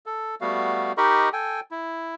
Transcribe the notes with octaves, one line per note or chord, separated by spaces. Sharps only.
A4
G3 A3 B3 F#4 F5
D#4 G4 A#4 D#5 B5 C#6
A4 G5 G#5
E4